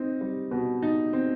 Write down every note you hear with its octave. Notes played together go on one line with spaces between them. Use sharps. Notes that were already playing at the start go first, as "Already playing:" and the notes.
Already playing: C4 D#4
G3
B2
D#4
C4